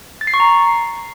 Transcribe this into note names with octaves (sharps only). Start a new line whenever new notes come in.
A6
C7
C#6
A#5